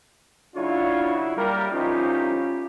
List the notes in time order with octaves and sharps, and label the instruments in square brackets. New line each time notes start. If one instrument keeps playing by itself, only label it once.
[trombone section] C#3 F#3 E4 [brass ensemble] D4 F4 C#5
[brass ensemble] G3 [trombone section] A#3 A#4
[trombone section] C2 F3 D#4 [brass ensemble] C#4 F4 G4